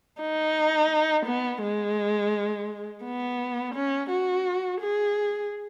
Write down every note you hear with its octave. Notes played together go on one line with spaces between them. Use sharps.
D#4
B3
G#3
B3
C#4
F#4
G#4